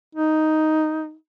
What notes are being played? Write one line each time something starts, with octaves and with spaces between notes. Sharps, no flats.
D#4